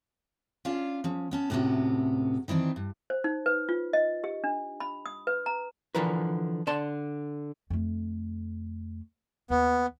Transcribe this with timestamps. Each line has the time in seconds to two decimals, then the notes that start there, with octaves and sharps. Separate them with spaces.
0.65 C#4 D4 F4 F5
1.04 F3 C#4
1.31 B3 C#4 A5
1.50 D2 A2 C3 B3 C#4 F#4
2.48 D#3 E3 C4 D4 B4
2.76 G2
3.10 C5
3.24 D#4
3.46 B4
3.69 F4
3.93 D#5
4.24 G4
4.44 D4
4.80 B5
5.06 D#6
5.27 B4
5.46 A#5
5.95 D3 E3 F3 A#4 B4
6.67 D3 D5 A5 C6
7.70 F2 A3
9.50 D#2 B3